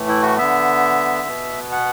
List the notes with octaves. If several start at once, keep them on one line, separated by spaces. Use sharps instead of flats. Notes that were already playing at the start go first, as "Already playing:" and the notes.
Already playing: A2 E3 A3
E4
F#4
D3 B3 E5
B2 B3
F#5